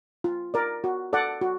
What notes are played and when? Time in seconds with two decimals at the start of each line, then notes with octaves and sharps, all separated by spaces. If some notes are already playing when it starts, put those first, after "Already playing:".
0.24 F4
0.54 A#4 D5
0.84 F#4
1.13 A4 D5 F#5
1.41 F#4